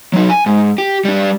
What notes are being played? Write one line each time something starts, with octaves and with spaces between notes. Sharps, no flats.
F#3 D#4
G#5
G#2
G4
G3 D4